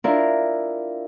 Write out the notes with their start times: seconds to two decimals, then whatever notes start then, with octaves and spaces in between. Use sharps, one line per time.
0.04 D4 E4 F4 A#4